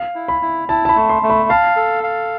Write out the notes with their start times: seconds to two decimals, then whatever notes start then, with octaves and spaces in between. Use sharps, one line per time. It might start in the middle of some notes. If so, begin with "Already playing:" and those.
Already playing: F5
0.15 E4
0.28 B5
0.42 E4
0.68 E4 A5
0.85 A5
0.89 B5
0.96 A3
1.09 C6
1.23 A3
1.30 B5
1.49 F5 A5
1.76 A4
2.03 F5